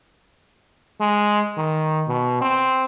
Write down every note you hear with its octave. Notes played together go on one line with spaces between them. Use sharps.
G#3
D#3
B2
C4